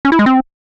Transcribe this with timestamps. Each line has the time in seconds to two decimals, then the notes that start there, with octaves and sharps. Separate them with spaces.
0.05 C#4
0.12 E4
0.19 G#3
0.26 C4